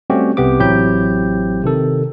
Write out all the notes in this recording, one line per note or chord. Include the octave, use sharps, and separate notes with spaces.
G3 A3 C4 C#4 F#4 G4
C2 C3 B3 G4 D6
A1 F#3 C4 E4 G4 G6
C3 D#3 A4